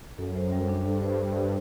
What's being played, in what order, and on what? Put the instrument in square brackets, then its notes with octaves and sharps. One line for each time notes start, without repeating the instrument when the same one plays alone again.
[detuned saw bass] F#2 [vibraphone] A4
[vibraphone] C5
G3
D4
[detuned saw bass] G2 [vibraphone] A4
[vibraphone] C5